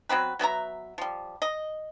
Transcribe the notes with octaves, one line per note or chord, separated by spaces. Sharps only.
F#3 B3 C4 B4
F#3 B3 E5 A#5
F3 G3
D#5